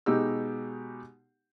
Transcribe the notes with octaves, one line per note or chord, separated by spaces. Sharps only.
B2 G#3 D#4 G4 E6